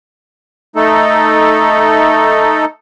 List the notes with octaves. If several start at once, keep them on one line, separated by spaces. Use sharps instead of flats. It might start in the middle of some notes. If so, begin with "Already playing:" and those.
A3 D#4 A4